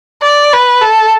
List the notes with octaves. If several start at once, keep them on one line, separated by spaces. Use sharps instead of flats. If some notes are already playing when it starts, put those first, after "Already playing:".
D5
B4
A4